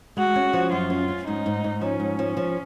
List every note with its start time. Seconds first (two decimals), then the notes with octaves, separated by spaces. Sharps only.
0.17 G#3 F#4
0.36 C#4
0.53 F3
0.72 F#2 F4
0.90 C#4
1.08 C#4
1.27 G#2 D#4
1.46 G#2
1.64 G#2
1.81 F3 C#4
2.00 G#2
2.19 F3
2.37 F3